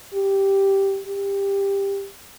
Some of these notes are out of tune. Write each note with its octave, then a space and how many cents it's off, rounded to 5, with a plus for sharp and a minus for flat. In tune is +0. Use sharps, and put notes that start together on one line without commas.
G4 -5
G4 +15